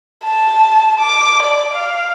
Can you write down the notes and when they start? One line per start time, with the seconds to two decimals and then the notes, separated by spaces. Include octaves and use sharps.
0.24 A5
0.99 D6
1.42 D5
1.73 F5